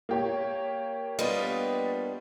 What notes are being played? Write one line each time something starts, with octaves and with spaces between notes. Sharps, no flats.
A#3 G4 C#5
G3 B3 D4 F4 B4 D#5